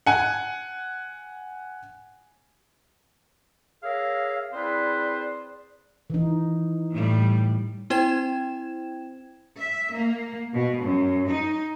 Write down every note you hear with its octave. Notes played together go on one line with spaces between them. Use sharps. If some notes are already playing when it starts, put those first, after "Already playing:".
F#5 G#5
G#4 A#4 C#5 E5 F5
C4 E4 G#4 B4 C5 D5
E3 D#4
A2 G3
C4 E4 C5 G5 G#6 E7
E5
A#3
B2
F#2
D#4